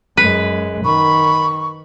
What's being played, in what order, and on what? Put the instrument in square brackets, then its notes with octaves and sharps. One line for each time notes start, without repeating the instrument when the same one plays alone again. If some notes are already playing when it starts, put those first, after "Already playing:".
[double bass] F#2 G#3 [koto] B4
[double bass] D#3 [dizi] B5 [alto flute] C#6